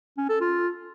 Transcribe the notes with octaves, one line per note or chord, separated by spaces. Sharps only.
C#4
A4
F4